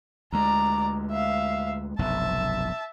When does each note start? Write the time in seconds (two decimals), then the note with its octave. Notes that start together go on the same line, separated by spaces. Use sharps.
0.33 D2 G#3 D5 A#5
1.11 E5 F5
1.99 F1 B1 G2 E5 A5